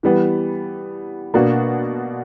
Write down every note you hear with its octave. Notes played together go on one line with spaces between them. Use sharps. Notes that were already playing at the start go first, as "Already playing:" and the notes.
E3 G3 B3
B2 A#3 D4 F#4